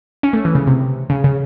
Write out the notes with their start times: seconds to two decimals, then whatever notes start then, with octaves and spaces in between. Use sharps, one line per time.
0.23 C#4
0.33 A3
0.45 E3
0.55 C#3
0.67 C3
1.10 C#3
1.24 C#3